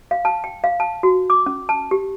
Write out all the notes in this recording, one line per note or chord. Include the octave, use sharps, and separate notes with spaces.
F5
A5
G5
F5
A5
F#4
D6
C#4
A5
G4